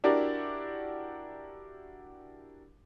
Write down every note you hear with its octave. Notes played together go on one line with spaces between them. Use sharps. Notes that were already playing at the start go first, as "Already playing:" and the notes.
D4 E4 F#4 G4 A#4 D5